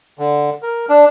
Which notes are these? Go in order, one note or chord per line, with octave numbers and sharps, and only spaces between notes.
D3
A#4
D4